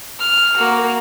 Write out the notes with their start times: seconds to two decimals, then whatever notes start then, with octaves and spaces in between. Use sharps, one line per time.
0.20 F6
0.57 A#3 F#4